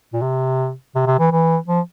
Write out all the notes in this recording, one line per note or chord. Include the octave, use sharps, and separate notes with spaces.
A#2
C3
C3
C3
E3
E3
F3